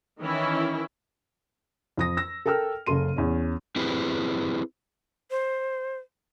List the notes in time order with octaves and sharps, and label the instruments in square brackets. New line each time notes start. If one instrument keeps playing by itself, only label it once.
[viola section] D#3 E3 C#4 E4
[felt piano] F2 D#6 A#6
E6 A#6
A4 A#4 G5 E6 F6
F#1 C#3 A4 C6 D#7
E2 C#4
[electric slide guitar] C4 E4 G4 G#4 B4 C5
[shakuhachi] C5